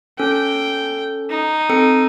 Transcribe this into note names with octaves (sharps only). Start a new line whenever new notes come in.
C#4 A4 G5
D#4
C4 A4 C#7